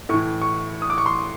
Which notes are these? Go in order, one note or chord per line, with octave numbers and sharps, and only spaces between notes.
A2 E3 C#6
C#6
D#6
D6
C#6
C6